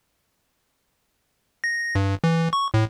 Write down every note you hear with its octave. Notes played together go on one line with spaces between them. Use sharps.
A#6
G2
E3
C#6
A2